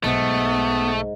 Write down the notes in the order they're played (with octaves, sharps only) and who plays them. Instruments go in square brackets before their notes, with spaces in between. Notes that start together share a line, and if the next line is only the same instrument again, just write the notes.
[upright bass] B1 [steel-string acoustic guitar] G#2 [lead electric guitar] A3 [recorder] B3